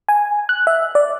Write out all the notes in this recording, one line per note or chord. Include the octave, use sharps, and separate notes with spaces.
G#5
F#6
E5
D5